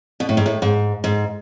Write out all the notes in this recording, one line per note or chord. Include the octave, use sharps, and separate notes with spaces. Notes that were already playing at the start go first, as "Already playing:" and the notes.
B2
A2
G#2
A2
G#2
G#2